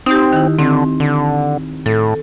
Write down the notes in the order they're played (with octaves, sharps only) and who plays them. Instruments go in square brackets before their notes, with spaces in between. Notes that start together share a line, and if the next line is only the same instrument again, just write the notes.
[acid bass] C4 [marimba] D#4 G4
[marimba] D#3 E4
[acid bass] D3 [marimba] C4
[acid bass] D3
[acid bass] A2 [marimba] A4